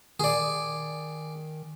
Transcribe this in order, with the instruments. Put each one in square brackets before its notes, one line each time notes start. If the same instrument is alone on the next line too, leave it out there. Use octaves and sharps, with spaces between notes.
[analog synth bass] D#3 [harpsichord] G#4 D5